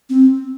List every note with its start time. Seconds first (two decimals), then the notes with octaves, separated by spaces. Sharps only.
0.10 C4